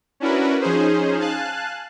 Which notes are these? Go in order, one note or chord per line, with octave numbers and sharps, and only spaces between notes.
C#4 D4 E4 F#4 A#4 B4
F3 C#4 D#4 G#4 C5
F5 G#5 A5 F#6